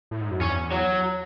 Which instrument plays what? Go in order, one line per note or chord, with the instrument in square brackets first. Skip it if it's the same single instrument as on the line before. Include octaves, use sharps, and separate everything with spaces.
[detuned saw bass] A2
G#2
F#2
[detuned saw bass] E2 [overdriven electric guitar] C#4
[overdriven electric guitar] F#3